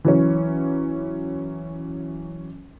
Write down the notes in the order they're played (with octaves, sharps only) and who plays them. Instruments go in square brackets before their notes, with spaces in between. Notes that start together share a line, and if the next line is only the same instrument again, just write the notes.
[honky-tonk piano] E3 F#3 C#4